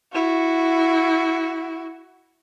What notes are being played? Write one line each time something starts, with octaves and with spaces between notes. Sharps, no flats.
E4 F#4